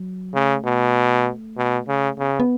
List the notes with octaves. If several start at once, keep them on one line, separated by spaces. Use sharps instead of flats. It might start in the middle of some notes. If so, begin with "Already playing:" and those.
Already playing: F#3
C#3 A3
B2
B2
C#3
C#3 B3
B3